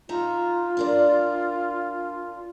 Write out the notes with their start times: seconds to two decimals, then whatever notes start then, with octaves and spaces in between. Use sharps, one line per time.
0.09 D#4 F4 E5 A#5
0.77 D4 A#4 D5